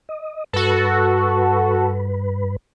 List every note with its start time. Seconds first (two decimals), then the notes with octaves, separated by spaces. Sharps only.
0.09 D#5
0.53 G2 F#4 A4 B4